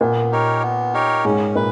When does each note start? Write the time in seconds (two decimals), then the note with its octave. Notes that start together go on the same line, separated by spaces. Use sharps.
0.01 A#2 B3
0.32 D#4 G4 A#4 C#5
0.63 B3
0.94 D#4 G4 A#4 C#5
1.25 G#2 C#4
1.56 A#2 B4